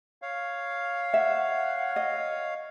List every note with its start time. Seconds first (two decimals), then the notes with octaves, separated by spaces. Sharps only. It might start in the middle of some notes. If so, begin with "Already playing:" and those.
0.22 C#5 F5
1.14 E5 F#5
1.96 D#5